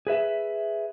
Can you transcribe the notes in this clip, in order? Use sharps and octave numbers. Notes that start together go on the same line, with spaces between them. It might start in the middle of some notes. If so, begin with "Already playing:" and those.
G#4 B4 E5